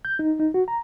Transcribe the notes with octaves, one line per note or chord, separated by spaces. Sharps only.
G6
D#4
D#4
F#4
A#5